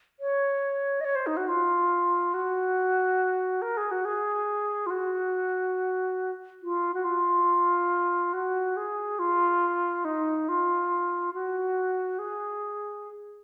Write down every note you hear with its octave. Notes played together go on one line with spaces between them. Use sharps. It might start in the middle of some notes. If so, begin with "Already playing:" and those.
C#5
D#5
C#5
C5
D#4
F#4
F4
F#4
A#4
G#4
F#4
G#4
F4
F#4
F4
F#4
F4
F#4
G#4
F4
D#4
F4
F#4
G#4